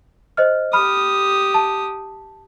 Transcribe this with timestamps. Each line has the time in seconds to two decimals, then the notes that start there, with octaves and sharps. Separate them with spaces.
0.37 C5 D#5 F6
0.73 G4 B5 D#6 F6
1.54 A5